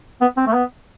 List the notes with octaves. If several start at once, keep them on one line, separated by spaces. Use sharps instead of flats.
B3
C4
A3
B3